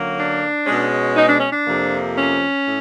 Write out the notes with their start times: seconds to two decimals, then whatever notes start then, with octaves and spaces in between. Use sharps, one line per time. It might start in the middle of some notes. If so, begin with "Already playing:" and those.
Already playing: D3 F#3 A#3 C#4
0.16 D4
0.65 B2 G#3 C#4
1.15 D#4
1.27 D4
1.38 C#4
1.50 D4
1.66 F2 C3 F3 A#3
2.16 C#4
2.66 A2